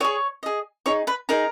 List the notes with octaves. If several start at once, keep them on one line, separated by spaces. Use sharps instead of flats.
G#4 C#5 D#5 C#6
G#4 D#5
D#4 G#4 C#5 C#6
B4 B5
D#4 G#4 A#4 A#5